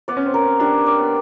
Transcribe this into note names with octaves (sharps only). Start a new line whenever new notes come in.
B3 D5
C#4
C4
A#4
C4
D4 G4
D5
B3